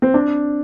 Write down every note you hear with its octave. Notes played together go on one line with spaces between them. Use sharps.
C4
D4